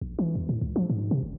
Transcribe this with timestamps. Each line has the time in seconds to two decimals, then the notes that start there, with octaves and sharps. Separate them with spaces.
0.01 A#1
0.19 E3
0.35 E2
0.49 A2
0.61 C#2
0.76 F3
0.90 G#2
1.11 C3
1.23 F1